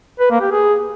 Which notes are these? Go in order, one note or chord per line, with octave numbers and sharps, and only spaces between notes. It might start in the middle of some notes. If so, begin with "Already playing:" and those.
B4
A#3
G4
G#4